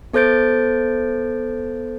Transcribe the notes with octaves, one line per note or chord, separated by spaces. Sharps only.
B3 A4 C5 G6 A6 D7